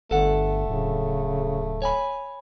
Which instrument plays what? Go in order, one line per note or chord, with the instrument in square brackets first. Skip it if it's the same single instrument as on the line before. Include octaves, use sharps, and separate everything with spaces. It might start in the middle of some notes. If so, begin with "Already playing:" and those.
[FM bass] G1 [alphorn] A3 [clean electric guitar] A4 F#5
[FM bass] D1 [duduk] C#3
[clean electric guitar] C#5 G#5 B5